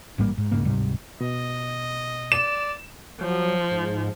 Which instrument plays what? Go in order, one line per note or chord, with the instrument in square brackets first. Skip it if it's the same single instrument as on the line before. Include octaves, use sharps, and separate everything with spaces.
[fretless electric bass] A1 G#2 G3 A#3
G#2
E1 G#2 C#3 A#3
D1 G#2 C3 G3
[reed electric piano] B2 [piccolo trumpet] D#5
[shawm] D5 [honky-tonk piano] E7
[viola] F3 [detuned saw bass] F#3
[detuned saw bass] G#2